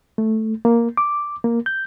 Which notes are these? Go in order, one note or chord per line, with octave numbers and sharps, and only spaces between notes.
A3
A#3
D6
A#3
G6